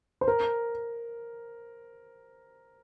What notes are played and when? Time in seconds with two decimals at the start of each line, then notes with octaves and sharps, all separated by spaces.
0.21 C5
0.28 A#4